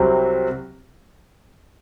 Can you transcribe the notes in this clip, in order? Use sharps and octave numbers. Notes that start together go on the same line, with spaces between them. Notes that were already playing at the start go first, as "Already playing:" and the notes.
Already playing: C2 C3 F#3 C4